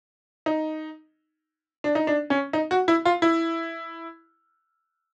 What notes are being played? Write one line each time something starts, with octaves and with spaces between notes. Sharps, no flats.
D#4
D4
D#4
D4
C#4
D#4
F#4
E4
F4
E4